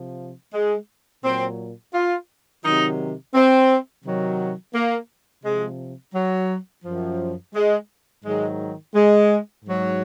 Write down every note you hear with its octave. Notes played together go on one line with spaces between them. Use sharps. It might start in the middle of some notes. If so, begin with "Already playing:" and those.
Already playing: C3 F3
G#3
A#2 F#3 C4
F4
C3 D#3 F#3 D#4
C4
C3 D#3 F#3
A#3
C3 F3 G#3
F#3
F#2 F3
G#3
G#2 D#3 F#3 G#3
G#3
G#2 F#3